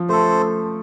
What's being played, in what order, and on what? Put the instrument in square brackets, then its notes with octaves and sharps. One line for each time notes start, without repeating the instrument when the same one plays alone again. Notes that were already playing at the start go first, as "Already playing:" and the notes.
Already playing: [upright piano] F3
[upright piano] A3 [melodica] A4 C5